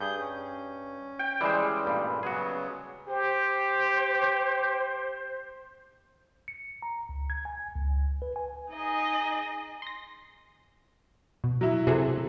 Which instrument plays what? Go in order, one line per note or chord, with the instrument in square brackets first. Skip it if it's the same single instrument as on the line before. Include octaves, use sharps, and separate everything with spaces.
[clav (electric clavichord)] G2 [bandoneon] G#4 G6
[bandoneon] C#4
[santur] G5
[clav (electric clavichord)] E3 C5 [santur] G3 G#3
[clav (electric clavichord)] A1 G2 A#2
[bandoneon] C#3 F#3 B3 [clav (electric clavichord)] F#4 G#4
[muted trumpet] G4 [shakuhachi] C5
[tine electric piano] C#7
A#5
C#2
G#6
G#5
C#2
B4
G#5
[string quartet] D#4 G#4 D#5
[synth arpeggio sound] C6 A#6
B2
[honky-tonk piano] F#3 E4
[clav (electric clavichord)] C3 [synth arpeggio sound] F#4 G#4 A4